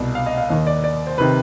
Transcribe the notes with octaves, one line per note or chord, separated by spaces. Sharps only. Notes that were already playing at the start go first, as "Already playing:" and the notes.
Already playing: C2 B2 D5
F5
D#5
F5
D#2 D#3 D#5
D5
D5
C5
C3 D#3 B4